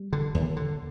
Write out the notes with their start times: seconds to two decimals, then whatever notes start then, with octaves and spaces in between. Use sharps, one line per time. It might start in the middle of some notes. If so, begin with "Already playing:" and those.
Already playing: G3
0.13 D3
0.35 D#2
0.56 D3